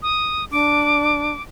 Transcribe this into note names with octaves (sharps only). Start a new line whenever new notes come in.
D#6
D4 D6